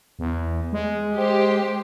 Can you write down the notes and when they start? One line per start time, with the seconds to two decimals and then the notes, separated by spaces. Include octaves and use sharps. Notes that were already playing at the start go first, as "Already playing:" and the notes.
0.19 E2
0.73 G#3
1.15 G4 C5